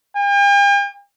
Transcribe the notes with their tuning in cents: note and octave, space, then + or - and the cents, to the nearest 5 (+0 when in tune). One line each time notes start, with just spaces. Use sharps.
G5 +45